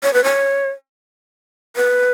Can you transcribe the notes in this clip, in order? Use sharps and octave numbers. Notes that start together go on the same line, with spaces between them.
C#5
B4
C#5
B4